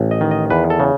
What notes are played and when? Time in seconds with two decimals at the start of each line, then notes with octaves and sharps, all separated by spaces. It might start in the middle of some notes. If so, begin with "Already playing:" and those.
Already playing: A1
0.11 D#5
0.21 D#3
0.31 D#5
0.50 E2 B4
0.70 A4
0.80 C#3